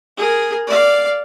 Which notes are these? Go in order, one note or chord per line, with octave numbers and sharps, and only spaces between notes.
G#4 A#4
D5 F5